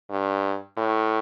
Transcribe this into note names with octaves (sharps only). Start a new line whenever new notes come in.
G2
A2